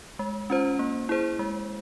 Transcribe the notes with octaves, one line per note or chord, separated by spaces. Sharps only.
G#3
C#4 F4 C5
A#3
E4 G#4 C5
G#3